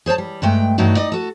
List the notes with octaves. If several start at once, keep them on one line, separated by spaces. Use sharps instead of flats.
G#4 C5 C#5 A5
G3
G2 G#3 A3 G5
G2 E3 F#3 A3 D#4 F#4
D#4 D5 D#5
F#4 A4